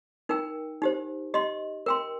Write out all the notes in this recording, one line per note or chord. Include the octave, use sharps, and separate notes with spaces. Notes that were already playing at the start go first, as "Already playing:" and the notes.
D#4 A#4 G5
D#4 G4 C5
G4 D#5 C6
A#4 G5 C6